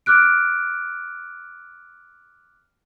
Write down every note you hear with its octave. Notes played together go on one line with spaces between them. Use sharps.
D6 F6 F#6 D7